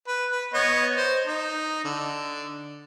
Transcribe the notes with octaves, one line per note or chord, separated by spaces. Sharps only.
B4
B4
B3 C#5 D#5
C5
D#4
D3